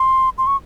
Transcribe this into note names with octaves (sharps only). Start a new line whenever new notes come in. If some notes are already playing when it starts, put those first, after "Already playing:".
Already playing: C6
C6
C#6